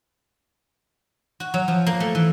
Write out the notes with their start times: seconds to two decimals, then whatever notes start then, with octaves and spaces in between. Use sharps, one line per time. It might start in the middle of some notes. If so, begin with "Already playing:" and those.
1.40 F#4
1.54 F#3
1.68 F3
1.87 A#3
2.00 A3
2.15 E3